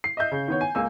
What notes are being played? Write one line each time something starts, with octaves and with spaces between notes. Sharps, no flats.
C7
D#5 E5 G6
C#3
D#3 B3 C#5
G#5
C#2 A#3 G#5 E6